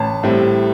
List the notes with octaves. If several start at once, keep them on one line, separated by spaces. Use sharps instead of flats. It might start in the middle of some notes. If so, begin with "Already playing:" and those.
Already playing: A1 A5
A2 G3 C4 E4